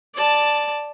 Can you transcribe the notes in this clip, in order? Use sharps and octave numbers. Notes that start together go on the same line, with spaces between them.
D5 A5